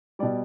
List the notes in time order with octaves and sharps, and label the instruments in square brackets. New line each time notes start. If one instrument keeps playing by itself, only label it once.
[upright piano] B2 G3 D5